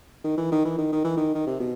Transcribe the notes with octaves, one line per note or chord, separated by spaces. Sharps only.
D#3
E3
D#3
E3
D#3
D#3
E3
D#3
D#3
C3
B2